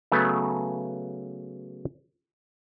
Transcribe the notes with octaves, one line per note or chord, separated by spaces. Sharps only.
C#3 F#3 A3 B3 A4 B4